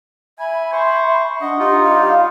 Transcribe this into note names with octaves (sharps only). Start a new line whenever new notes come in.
E5 G#5 B5
C5 C#6
D4 D#5 F#5
D#4 F4 G4
G3 F5